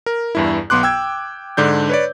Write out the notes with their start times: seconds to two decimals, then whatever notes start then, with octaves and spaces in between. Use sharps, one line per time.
0.06 A#4
0.35 E2 G2 E4
0.70 B1 B3 C6 D6 F#6
0.83 G5 E6 G#6
1.57 G#2 D3 D4 G6
1.89 B4 C#5 D5